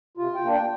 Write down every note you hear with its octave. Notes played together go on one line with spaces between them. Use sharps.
C3 F4
G5
A#3 D4
G5